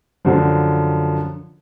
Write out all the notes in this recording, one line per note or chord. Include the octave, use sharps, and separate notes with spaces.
F#2 D3 F3